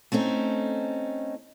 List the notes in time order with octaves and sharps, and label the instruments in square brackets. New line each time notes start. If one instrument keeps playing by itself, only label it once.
[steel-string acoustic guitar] A3 C4 C#4 D#4